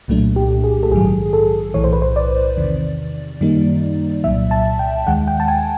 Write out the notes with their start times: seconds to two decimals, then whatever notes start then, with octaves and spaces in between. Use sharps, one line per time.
0.08 C2 A#2 F#3 A3 D4
0.36 G4
0.64 G#4
0.83 A4
0.91 A#1 G#2 D#3 F#3 G#4
1.33 A4
1.74 B1 A2 E3 C#5
1.84 C5
1.93 B4
2.02 C5
2.16 D5
2.57 E2 C3 D#3
3.41 F#2 D#3 G3 A#3 D#4
4.24 C2 A#2 F#3 E5
4.51 A5
4.79 G5
5.07 D#2 D#3 G#3 F#5
5.28 G5
5.40 A5
5.48 G#5